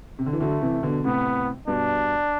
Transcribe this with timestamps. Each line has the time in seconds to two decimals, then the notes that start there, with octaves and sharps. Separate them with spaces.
0.19 C3
0.26 D3
0.33 E3
0.40 D3 F#3 A3
0.62 C3 E3
0.83 B2 D3
1.04 A2 C3 B3
1.68 G2 B2 D4